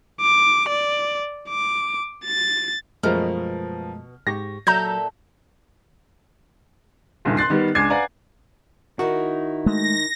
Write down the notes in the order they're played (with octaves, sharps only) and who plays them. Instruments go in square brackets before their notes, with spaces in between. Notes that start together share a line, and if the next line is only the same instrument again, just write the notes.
[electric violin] D6
D5
D6
A6
[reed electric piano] F#2 G#3 A3 [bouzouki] B2 [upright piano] F3 A#4 F6
[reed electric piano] G#2 G4 C#6 [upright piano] A#6
[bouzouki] A#2 A4 E5 [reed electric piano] F#3 [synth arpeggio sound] A#5 G6
[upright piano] F#1 C2 G2 A#2 D#3
C6 F#6 A6 C7
D#3 G3 B3
C#2 D4 G#5 D6 G#6 C7
B4 D5 F5 F#5 G#5 A#5
[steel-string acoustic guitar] D#3 D#4 E4 [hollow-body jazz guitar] F#4
[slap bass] G#3 A3 [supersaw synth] A#6